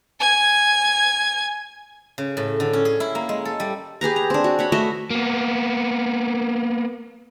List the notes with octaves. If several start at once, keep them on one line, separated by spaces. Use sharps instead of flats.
G#5 G#6
C#3
A2
D3
C#4
G#4
E4
A#3
G#3
A4
G3
G4 G#4 B4 A#5
A#5
C4 D4
F#4
C#5 F#5 B5
A3 F#4 D#5 E5
A#3 B3